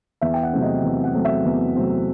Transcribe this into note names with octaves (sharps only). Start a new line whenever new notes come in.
E2 E5
G5
F#5
C3 F#3 A3 C4
D#5
E2
F#5
C3 F#3 A3 C4
E5
E2
C3 F#3 A3 C4